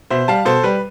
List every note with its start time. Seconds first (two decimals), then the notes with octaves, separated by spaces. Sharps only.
0.10 B2 C5 E5
0.28 G3 F5 A5
0.45 B2 A4 C5
0.63 G3 B4